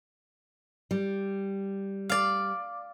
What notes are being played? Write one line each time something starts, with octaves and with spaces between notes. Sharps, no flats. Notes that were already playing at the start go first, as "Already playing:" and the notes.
G3
D5 F5